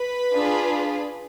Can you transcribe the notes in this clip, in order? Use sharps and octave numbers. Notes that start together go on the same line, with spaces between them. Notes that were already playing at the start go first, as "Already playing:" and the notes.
Already playing: B4 B5
D4 F4 G#4